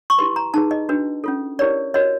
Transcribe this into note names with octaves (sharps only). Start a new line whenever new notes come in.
C#6
E4 G4 B4 C6
A#5
D#4 G#4 B4 A5
D#5
D4 F#4 B4
C#4 F4 A4
E4 G4 A#4 C#5 D5
F#4 A#4 C#5 D#5